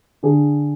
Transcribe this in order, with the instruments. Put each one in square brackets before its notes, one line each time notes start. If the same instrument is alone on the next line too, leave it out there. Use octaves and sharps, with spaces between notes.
[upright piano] D3 G#4